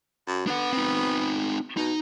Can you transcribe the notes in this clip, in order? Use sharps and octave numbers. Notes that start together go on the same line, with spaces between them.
F#2
B3 D4 F#5
C4 D#4
B2 D#4